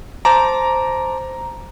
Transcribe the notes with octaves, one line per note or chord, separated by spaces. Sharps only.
C5 A5 A#5 D6